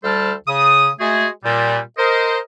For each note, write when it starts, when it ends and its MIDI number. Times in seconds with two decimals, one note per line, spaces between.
0.04 0.33 38
0.04 0.33 55
0.04 0.33 69
0.04 0.33 72
0.04 0.33 81
0.04 0.33 89
0.47 0.90 49
0.47 0.90 87
1.00 1.27 56
1.00 1.27 57
1.00 1.27 66
1.00 1.27 68
1.44 1.79 46
1.44 1.79 55
1.98 2.38 70
1.98 2.38 72
1.98 2.38 75